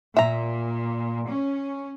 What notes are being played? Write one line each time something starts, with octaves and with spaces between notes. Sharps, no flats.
A#2 E5 A#5
C#4